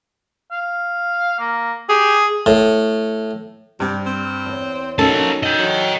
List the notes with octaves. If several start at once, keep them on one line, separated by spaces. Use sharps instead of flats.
F5
A#3
G4 G#4
A2
G2 C3 G3 G5
C4
E2 C#5
A#3 C#4 D#4 F#4 A4 A5
D#5 G5
F#3